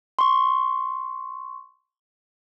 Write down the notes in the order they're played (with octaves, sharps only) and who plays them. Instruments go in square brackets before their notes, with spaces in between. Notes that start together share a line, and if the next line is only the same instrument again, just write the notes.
[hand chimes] C6 C#6